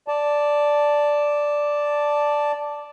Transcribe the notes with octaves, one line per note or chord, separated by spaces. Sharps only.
D5 A5